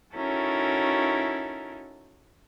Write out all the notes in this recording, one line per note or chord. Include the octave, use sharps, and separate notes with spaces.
C#4 D#4 E4 F#4 A4 A#4